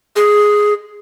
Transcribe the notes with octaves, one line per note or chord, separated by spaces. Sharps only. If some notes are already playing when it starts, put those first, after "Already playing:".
G#4